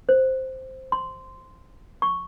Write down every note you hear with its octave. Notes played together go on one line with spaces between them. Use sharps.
C5
C6
C#6